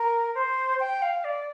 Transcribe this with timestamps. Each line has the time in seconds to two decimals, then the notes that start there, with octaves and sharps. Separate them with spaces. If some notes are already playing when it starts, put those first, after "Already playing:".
Already playing: A#4
0.34 C5
0.80 G5
1.02 F5
1.24 D5